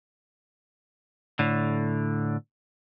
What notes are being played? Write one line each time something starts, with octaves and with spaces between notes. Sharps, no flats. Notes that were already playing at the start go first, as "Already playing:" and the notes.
A2 D3